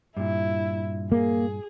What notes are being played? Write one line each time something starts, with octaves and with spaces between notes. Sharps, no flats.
G2 A#2 E4
A#3 G#4